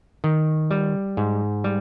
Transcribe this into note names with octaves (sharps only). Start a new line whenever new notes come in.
D#3
G3
G#2
G3